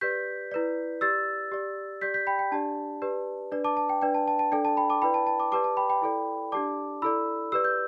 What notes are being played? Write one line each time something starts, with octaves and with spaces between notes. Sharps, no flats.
G4 B4 D5 G6 B6
E4 B4 D5
G4 D5 E6 A6
G4 D5
G4 D5 G6 B6
G6 B6
G5 B5
G5
D4 G4 D5 A5
G4 B4 D5
D4 B4 D5
A5 D6
A5
G5
D4 B4 D5 G5
A5
A5
A5
D4 A4 D5 G5
A5
G5 B5
A5 D6
E4 B4 D5 G5 B5
A5
A5
A5 D6
G4 B4 D5 A5 D6
A5
G5 B5
G5 B5
E4 A4 D5
D4 G4 D5 A5 D6
E4 A4 D5 B5 E6
G4 B4 D5 E6
G6